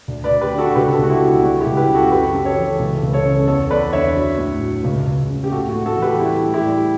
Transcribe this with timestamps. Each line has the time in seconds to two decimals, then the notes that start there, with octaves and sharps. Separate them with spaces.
0.08 D2
0.24 B4 D5
0.30 D2
0.41 G4 B4
0.53 D3
0.58 F#4 A4
0.76 C#2 G4 B4
0.92 F#4 A4
0.98 C#2
1.04 F#4
1.10 E4 G4
1.21 B2
1.27 F#4
1.43 G3 F#4
1.61 E4 G4
1.66 C#2
1.77 G4 B4
1.89 C#3
1.95 F#4 A4
2.11 F#2 G4 B4
2.34 F#2
2.45 A4 C#5
2.57 E3
2.79 C#2
3.03 C#2
3.13 A4 C#5
3.25 C#3
3.48 E2 A4 C#5
3.70 E2 B4 D5
3.93 D3 C#5 E5
4.16 F#3
4.38 A2
4.61 F#3
4.84 C#2
5.06 C#2
5.29 C#3
5.44 G4
5.52 A2 F#4 A4
5.69 F#4
5.75 A2
5.86 F#4 A4
5.97 E3
6.02 G4 B4
6.20 G3 E4 G4
6.43 A2
6.54 E4 G4
6.65 G3